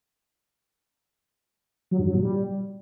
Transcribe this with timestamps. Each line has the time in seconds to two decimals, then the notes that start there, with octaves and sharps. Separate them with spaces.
1.91 F#3
1.99 G2
2.07 F#3
2.15 A#2
2.23 G3